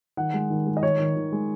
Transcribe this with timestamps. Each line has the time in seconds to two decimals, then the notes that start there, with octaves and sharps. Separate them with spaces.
0.17 D#3 F#5
0.34 G#3
0.50 D#3
0.67 G#3
0.77 D#5
0.83 D#3 C#5
0.99 D#3
1.16 D#3
1.32 G#3